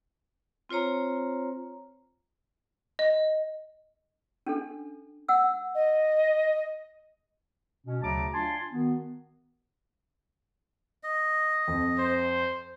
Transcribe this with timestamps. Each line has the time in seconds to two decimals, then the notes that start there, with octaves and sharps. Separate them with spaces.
0.69 C4 F4 C5 C#5 A#5
2.99 D#5
4.46 C#4 D4 A4
5.29 F#5 E6
5.75 D#5
7.85 B2 C#4
8.02 D2 C#3 F#3 A5 A#5 D6
8.33 D4 F4 G#5 A5 C6
8.72 D#3 B3 F#4
11.03 D#5
11.68 F2
11.99 C5